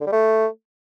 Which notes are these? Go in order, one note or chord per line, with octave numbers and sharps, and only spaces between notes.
D3
G3
A3